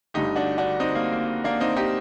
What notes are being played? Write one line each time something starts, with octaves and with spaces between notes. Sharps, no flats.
G1 G2 D3 A3 D#4 G4
D4 F#4
D4 F#4
C4 D#4
A#3
A#3
A#3 D4
C4 D#4
D#4 G4